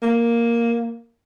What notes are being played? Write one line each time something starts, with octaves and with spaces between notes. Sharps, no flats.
A#3